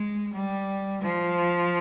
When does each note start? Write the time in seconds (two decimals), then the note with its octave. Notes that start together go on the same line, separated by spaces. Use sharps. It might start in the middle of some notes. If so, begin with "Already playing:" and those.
Already playing: G#3
0.33 G3
1.02 F3